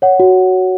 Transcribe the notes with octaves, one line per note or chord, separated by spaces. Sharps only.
C#5 F#5
F#4